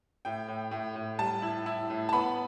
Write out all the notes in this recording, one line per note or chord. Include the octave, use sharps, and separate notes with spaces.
A2 G5
A2
A2
A2
G3 A5
E4
E4
A2
A5
B3 B5